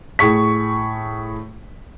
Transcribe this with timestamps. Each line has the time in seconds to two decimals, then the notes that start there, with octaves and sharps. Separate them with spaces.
0.19 A2 G#4 C#6 B6